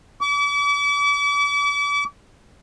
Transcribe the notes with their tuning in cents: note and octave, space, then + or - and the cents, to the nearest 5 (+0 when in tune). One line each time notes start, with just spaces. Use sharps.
D6 -40